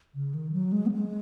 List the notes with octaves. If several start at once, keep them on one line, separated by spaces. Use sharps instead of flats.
C#3
D#3
F#3
G#3
B3
G#3